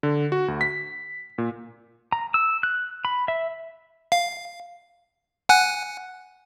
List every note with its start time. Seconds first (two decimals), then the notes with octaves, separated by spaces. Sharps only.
0.03 D3
0.32 F#4
0.48 D2
0.61 B6
1.38 A#2
2.12 A#5
2.34 E6
2.63 F#6
3.05 B5
3.28 E5
4.12 F5
5.49 F#5 G#5 F#6